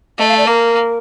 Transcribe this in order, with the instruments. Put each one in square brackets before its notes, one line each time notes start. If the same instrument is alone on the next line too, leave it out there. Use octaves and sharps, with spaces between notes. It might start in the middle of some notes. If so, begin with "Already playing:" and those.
[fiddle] A3 [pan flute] D#5
[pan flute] F5
D5
[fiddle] A#3 [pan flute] A#4